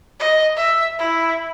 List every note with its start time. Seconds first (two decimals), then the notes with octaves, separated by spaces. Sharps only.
0.20 D#5
0.57 E5
0.99 E4